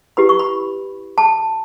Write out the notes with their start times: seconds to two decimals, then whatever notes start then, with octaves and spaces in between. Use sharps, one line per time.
0.17 E4 G4 B4 B5
0.29 C#6
0.39 B5
1.18 A5